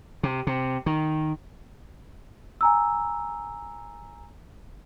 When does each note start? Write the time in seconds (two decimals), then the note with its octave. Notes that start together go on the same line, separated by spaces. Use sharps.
0.23 C3
0.47 C3
0.86 D#3
2.61 G#5 A#5 E6